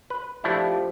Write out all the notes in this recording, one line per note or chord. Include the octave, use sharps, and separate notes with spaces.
B4
F3 A3 D4 E4 G4